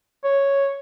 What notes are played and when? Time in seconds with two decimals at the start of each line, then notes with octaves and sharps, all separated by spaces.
0.24 C#5